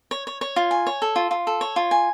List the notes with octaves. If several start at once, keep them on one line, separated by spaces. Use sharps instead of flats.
C#5
C#5
C#5
F4
G#5
C#5
A4
F4
F4
A4
C#5
F4
G#5